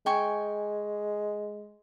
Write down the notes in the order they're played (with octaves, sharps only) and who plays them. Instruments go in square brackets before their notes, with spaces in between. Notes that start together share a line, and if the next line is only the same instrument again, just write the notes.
[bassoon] G#3 [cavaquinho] G5 G#5 C#6